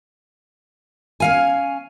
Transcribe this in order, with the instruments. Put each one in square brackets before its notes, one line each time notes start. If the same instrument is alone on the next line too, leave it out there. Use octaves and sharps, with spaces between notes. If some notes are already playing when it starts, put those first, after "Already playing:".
[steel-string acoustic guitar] C#4 F5 G#5